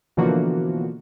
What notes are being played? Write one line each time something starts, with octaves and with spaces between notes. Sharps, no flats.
B2 D3 E3 F3 A#3 F#4